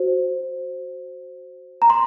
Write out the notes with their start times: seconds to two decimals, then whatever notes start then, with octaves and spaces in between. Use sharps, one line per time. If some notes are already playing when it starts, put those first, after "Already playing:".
Already playing: F#4 C5
1.82 A#5
1.90 C6